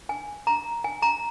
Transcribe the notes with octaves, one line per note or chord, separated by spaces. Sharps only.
G#5
A#5
G#5
A#5